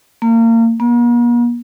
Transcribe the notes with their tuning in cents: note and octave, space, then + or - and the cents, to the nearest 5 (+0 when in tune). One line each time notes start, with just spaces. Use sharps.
A#3 -30
A#3 +45